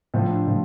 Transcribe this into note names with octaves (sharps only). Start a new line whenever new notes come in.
A2 F3 A3 C4
D4
A2 F3 A3